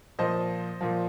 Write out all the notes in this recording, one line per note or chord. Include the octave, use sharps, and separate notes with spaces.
A#2 F3 C5 D#5
A#2 F3